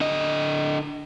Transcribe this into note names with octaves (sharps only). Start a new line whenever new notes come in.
D3 D#5